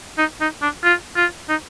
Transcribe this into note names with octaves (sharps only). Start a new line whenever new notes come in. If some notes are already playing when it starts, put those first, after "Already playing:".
D#4
D#4
D4
F4
F4
D#4